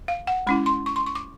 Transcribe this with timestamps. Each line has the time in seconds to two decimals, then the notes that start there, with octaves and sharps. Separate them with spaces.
0.08 F5
0.27 F#5
0.47 G#3 C#4 E4 B5
0.66 C6
0.86 C#6
0.96 C6
1.06 C#6
1.15 D6